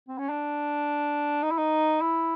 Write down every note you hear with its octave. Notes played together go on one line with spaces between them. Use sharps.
C4
C#4
D4
D#4
E4
D#4
E4